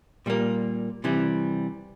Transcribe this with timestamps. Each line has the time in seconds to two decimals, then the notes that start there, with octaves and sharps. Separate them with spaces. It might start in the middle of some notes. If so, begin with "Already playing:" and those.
0.26 A#2 G3 A#3
1.04 C3 E3 G3